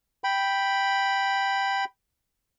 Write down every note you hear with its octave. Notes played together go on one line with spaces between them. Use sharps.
G5 B5